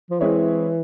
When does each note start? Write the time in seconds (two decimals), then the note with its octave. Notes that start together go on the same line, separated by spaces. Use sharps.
0.10 F3
0.20 E3 G#3 C4 E4 G#4 C#5